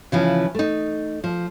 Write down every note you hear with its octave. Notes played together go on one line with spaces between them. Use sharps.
C#3 E3 F3
A3 D#4
F3